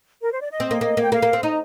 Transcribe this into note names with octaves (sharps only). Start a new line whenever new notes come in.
A#4
C5
D5
D#5
C4
A#3
A#3
A#3 G5
A#3 F5
A#3
C4
D#4 A#5